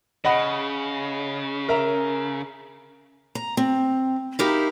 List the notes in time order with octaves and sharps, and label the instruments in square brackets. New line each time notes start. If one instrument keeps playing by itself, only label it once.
[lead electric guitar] C#3 [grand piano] D#5 F#5 B5
[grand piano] A#4 E5 A#5
[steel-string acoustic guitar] A#5
C4
D#4 E4 G4 A#4 F5